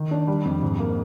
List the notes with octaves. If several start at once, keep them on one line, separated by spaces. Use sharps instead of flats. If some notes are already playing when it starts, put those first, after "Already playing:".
Already playing: D#3
D4
G3
F2
G#2
A#3